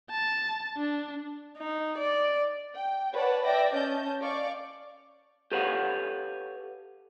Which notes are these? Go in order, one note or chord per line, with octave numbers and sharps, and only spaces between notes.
A5
D4
D#4
D5
G5
B4 C#5 D5 F#5 A5
D5 E5 G5 A#6
C#4 D#5 A5 G6
D5 F5 C#6 D6
G4 A4 B4 C#5 F5 F#5